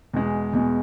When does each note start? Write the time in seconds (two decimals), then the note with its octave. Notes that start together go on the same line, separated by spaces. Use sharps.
0.14 E2 B2 G#3
0.53 E2 B2 G#3